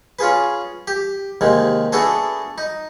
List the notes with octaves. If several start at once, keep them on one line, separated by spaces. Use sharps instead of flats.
C#4 F4 G#4 B4
G4
D#2 C3 D#3 G#3
A3 B3 D4 F#4 G#4 A4
D#4